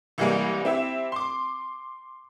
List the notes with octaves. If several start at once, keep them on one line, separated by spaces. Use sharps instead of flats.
C2 E3 G3 G#3 A#3
C4 E4 G4 E5 E7
C6 D6